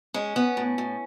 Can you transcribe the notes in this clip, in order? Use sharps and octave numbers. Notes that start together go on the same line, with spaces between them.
G#3 C#4
B3
A2
A2